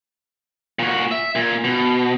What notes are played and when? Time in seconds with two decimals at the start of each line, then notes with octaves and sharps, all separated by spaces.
0.79 A#2 F#4
1.11 E5
1.35 A#2
1.64 B2